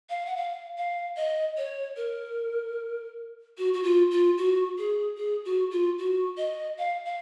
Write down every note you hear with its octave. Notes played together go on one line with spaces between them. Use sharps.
F5
F#5
F5
F5
D#5
C#5
A#4
F#4
F#4
F4
F4
F#4
G#4
G#4
F#4
F4
F#4
D#5
F5
F5